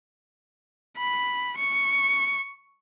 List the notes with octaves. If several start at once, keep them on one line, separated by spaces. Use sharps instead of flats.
B5
C#6